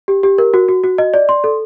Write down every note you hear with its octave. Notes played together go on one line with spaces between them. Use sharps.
G4
G4
A#4
F#4
F#4
F#4
D#5
D5
C6
A4